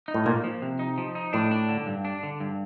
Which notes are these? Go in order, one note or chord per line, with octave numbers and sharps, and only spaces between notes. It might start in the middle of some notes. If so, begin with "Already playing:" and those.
D#4
A2
A#2 A#3
F3
C3
D#4
F3
D#4
A2 D4
D4
D3
G2
D4
D3
G2